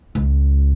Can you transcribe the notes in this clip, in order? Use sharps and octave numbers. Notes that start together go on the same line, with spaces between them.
C#2